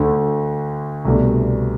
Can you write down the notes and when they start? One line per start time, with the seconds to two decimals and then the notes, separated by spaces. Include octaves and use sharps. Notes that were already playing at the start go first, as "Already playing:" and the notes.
Already playing: D2 D3 A3
1.05 C2 B2 A3 D4